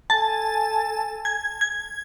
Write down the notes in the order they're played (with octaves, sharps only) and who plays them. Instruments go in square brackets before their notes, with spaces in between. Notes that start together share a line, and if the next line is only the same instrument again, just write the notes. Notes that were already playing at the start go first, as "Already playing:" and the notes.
[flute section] A4 G#5 [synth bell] A5
[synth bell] G#6
G#6